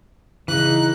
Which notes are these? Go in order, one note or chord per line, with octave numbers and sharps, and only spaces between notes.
C#3 E3 D#4 F#6